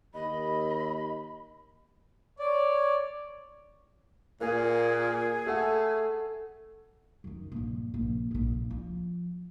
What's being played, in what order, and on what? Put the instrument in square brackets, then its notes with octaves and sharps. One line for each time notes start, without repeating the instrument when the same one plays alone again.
[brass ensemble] D#2 [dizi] D#5 [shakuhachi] B5
[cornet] C#5 [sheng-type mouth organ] D5
[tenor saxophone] A#2 [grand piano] A#3 [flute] G#4
[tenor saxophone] A3 [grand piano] A4 F#5
[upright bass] F#2 D#3
A#1 G2
A#1
D1 A#1
F3